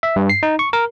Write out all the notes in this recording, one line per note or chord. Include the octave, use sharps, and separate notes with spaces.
E5
G2
C7
D#4
C#6
A#4